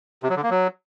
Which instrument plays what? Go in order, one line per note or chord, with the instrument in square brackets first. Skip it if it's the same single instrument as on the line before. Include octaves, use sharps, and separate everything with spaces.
[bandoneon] C3
F#3
D3
A#3
F#3